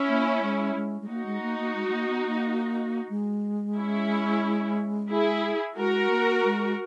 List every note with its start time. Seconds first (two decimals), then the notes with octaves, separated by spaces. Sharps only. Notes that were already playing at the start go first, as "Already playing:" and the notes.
Already playing: C#4 E4
0.08 A#3
0.42 G#3
0.75 G#3
1.01 G#3
1.09 A#3 D#4 F#4
1.26 G#3
1.42 A#3
1.59 A#3
1.75 G#3
1.88 G#3
1.93 A#3
2.09 B3
2.26 A#3
3.09 G#3
3.77 C#4 E4
5.10 E4 G#4
5.77 G#3 F#4 A#4
6.10 A#3
6.44 G#3